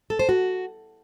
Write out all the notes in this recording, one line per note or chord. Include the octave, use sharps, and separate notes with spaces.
A4
C5
F#4